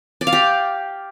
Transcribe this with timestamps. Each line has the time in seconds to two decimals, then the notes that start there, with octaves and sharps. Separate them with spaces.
0.21 D5
0.27 F5
0.33 G4